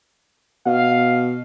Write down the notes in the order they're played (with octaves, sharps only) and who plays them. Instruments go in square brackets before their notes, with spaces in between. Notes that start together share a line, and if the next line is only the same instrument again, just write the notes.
[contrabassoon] B2 [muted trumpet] F5